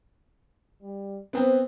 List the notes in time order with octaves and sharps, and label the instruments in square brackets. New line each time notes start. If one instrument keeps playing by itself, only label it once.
[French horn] G3
[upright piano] B3 C4 B4 [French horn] C5